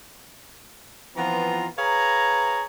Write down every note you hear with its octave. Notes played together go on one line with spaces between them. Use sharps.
E3 F3 B3 C4 F4 A#5
G#4 B4 C#5 F5 A#5